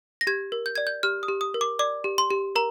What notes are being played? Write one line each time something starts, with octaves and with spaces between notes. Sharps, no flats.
A#6
G4 G#6
A#4
G6
D5 G#6
G6
G4 F6
D#6
G4
D#6
A#4
D6
D5 D6
G4
C6
G4
A#4 A#5